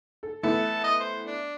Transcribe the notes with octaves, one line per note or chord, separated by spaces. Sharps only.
A4
E3 A3 B3 A4
D#5
C5
D4